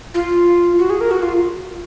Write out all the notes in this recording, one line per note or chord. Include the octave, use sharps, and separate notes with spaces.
F4
F#4
G#4
A#4
F#4
F4